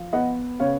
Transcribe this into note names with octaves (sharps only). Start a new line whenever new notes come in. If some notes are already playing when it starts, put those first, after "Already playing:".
Already playing: F3
B3 D#5 F#5
C#3 C#5 F5